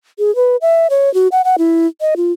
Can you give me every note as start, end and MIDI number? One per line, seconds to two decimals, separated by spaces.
0.19 0.34 68
0.36 0.56 71
0.62 0.87 76
0.90 1.12 73
1.14 1.28 66
1.32 1.42 78
1.45 1.56 78
1.58 1.87 64
2.01 2.15 75
2.17 2.32 65